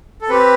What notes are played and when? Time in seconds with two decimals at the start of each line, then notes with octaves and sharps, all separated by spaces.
0.22 A4
0.29 C4 G4 B4